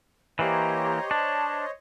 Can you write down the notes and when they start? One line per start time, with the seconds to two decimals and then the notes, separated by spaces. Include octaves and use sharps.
0.39 E3 A#3 G4 C5 C#5 D#5 A#5
1.11 D4 A5